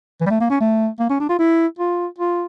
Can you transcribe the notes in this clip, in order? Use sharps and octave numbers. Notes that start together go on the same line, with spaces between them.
E3
G3
A3
A#3
C#4
A3
A#3
C#4
D4
F4
E4
F4
F4